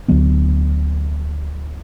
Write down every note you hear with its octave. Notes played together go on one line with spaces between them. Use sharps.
D2 D3 F#3 B3